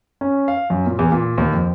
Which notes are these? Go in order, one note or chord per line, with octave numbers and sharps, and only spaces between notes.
C#4
F5
F#2
A#2
E2
A#2
D#2
F2